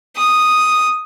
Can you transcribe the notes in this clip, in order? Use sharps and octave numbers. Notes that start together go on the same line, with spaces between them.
D#6